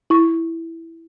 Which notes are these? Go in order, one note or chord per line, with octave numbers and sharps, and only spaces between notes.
E4 C#6